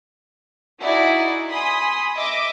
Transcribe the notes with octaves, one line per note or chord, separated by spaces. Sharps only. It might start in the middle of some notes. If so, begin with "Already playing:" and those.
D#4 E4 F#4 G#4 D5
G#5 B5 C6 D#6
D#5 E5 D6